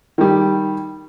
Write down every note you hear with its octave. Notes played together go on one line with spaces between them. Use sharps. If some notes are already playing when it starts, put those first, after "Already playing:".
D#3 G3